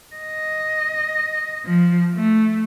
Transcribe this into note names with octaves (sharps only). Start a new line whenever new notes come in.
D#5
F3
A3